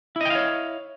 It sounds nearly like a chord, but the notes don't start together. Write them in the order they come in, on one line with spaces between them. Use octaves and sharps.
E4 D#5 G5 F5 C#5